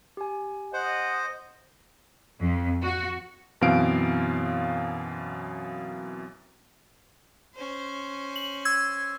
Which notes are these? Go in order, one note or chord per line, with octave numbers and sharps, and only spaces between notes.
G4 G#5
C5 D#5 F#5
F2
F#4
F#2 B2 E3 C4 F5 D7
C#4 C5
F#7
E6 G#6